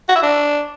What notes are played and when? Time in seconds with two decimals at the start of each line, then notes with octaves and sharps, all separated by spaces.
0.09 F#4
0.16 E5
0.23 D4